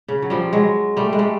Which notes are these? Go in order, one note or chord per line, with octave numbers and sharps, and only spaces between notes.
C#3
F#3
F3 G3
F#3 G#3
G3 A3
G#3
G3 A3